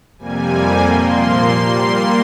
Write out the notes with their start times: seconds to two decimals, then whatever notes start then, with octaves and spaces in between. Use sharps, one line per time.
0.18 F2 C3 G3 A#3 G#5
0.82 A#2 F3 A#3 C6
1.47 A#2 G3 A#3